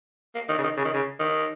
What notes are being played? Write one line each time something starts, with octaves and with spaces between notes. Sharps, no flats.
A#3
D#3
C#3
D#3
C#3
D#3
C#3
D#3